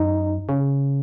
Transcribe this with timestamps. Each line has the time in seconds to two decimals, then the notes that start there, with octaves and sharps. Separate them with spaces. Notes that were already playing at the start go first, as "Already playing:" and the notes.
Already playing: F#2 D#4
0.49 C#3